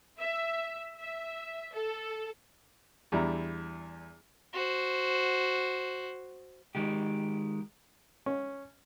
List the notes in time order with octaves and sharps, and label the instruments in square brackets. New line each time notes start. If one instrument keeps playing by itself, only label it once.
[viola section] E5
E5
A4
[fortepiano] E2 G3 D4 E4 A#5
[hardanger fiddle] F#4 C5
[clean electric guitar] D#3 G#3 G4
[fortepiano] C#4